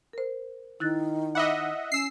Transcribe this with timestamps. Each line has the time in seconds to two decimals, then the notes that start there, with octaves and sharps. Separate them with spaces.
0.13 A#4 C5
0.80 D#3 E4 F#6 A6
1.35 D#5 E5 F#5 B5 D6
1.92 C#4 E6 C7